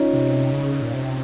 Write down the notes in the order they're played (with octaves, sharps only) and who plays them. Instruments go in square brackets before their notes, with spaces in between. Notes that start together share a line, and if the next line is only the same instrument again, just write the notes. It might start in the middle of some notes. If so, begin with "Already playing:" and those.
Already playing: [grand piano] C#4 D#4 F4
[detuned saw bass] C3
C#3
A#2
C3